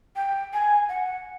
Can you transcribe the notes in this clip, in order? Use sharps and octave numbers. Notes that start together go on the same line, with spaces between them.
G5
G#5
F#5